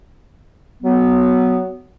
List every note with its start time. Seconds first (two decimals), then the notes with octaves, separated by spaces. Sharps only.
0.83 F#3 B3